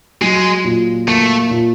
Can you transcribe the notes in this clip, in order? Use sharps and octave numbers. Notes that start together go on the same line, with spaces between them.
F#3 G#3
A#2
A3 A#3
A#2